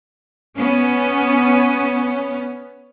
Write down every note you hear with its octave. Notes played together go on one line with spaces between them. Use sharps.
B3 C#4